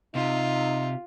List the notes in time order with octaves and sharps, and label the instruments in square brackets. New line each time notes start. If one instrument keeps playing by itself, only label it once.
[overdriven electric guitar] C3 [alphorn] D#4 [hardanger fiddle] F4